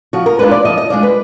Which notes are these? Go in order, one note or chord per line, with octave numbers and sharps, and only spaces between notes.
F3 F#4
A#4
G#3 D4 F4 B4
D5
F3 D#5
D#5
G#3 D4 F4 D5
B4